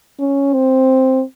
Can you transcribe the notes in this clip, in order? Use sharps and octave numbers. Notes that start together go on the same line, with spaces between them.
C#4
C4